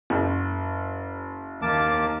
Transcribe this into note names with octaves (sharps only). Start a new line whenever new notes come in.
F#1
D#2 A#3 A5 D6